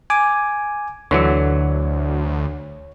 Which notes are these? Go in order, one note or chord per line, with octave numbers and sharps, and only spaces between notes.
G#5 D6
D2 D3 E3 F#3 C#5